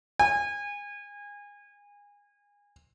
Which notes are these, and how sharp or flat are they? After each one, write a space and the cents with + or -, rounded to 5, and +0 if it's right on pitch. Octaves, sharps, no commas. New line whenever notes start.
G#5 -25